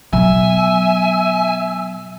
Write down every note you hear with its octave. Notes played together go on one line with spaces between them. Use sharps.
B2 F#3 B3 E5 G#5